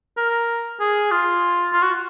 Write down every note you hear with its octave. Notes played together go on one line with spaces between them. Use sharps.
A#4
G#4
F4
F4
F#4